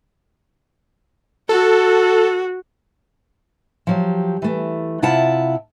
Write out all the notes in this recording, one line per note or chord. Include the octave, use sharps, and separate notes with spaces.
F#4 A4
F3 F#3 G4
E3 A3
C3 E4 F4 F#5 A5